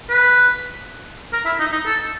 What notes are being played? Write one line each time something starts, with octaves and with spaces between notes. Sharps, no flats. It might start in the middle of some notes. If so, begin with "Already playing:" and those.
B4
A#4
E4
D#4
D#4
A4